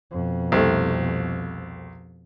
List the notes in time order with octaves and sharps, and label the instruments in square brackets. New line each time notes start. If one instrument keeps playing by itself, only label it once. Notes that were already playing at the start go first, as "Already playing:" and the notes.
[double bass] F2 B2
[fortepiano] C2 A3